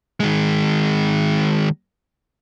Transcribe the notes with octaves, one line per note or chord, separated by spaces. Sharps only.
D#3 G#3